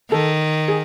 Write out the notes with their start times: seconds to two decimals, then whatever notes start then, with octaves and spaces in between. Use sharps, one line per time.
0.11 D#3 A4
0.68 G#4